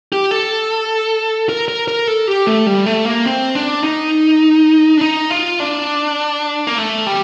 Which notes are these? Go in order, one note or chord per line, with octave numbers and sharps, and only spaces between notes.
G4
A4
A#4
A#4
A#4
A4
G4
A3
G3
A3
A#3
C4
D4
D#4
D4
D#4
F4
D4
A#3
A3
G3